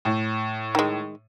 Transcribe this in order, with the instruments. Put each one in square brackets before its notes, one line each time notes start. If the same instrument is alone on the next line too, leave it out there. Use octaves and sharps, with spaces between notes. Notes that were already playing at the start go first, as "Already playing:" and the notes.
[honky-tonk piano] A2
[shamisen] D#3 G#3